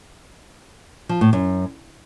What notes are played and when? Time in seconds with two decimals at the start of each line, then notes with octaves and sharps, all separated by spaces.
1.09 F3
1.21 A2
1.33 F#2